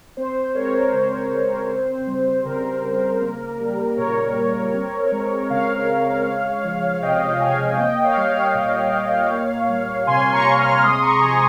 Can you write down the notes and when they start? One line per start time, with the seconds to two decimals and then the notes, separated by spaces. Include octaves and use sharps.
0.17 C4 C5
0.36 C5
0.55 G#3 A#4 C#5
0.74 A#4 C#5
0.93 C#3 C5
1.31 C#3
1.69 C4
2.07 G3
2.45 C#3 A#4
2.83 C#3
3.21 A#3
3.60 G3
3.97 A#2 A#4 C#5
4.36 A#2
4.74 C4
5.12 G#3
5.50 C#3 C#5 F5
5.88 C#3
6.26 G#3
6.64 F3
7.02 C3 D#5 G5
7.40 C3 F5 G#5
7.79 A#3 D#5 G5
7.98 G5
8.04 C#5 F5
8.17 G3
8.29 C#5 F5
8.55 A#2
8.93 A#2
9.31 A#3
9.69 G3
10.07 C3 G#5 C6
10.32 A#5 C#6
10.45 C3
10.58 C#6 F6
10.83 G#3 C6 D#6
11.02 A#5 C#6
11.21 F3 G#5 C6